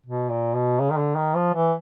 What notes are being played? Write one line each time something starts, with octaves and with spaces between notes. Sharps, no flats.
B2
A#2
B2
C#3
D#3
D3
D#3
F3
E3